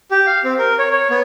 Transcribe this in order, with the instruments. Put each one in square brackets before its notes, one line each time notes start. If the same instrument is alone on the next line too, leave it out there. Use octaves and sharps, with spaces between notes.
[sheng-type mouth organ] G4
F5
C4
A#4
C#5
C#5
B3